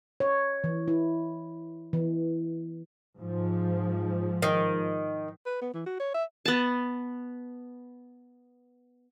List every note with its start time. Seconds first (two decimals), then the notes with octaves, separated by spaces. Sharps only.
0.20 C#5
0.64 E3
0.88 E4
1.93 E3
3.19 G#2 F3
4.42 D#3
5.46 B4
5.62 B3
5.74 E3
5.86 F#4
6.00 C#5
6.14 E5
6.45 B3 A5